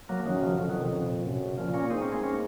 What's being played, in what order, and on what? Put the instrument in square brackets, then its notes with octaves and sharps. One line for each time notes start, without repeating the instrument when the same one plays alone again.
[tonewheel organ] F#3 A#3
[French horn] F#2 [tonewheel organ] D#3 F#3
[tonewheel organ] C#3 F3
[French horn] F2 [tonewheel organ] C#3 F3
[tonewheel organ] D#3 F#3
C3 D#3
C#3
A#2
[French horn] F#2 [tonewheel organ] C3
[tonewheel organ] C#3
[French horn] A#2 [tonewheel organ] C#3 F3
[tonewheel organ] A#3 C#4
[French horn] G#2 [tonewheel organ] C4 D#4
[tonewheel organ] A#3 C#4
G#3 C4
A#3 C#4